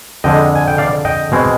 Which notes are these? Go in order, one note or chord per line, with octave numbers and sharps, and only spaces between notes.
F2 D3 G#3 D#5 G5
G#5
G5
D5 F5
D#5 G5
B2 G#3 C4